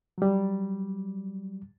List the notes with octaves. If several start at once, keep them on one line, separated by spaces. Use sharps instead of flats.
F#3 G3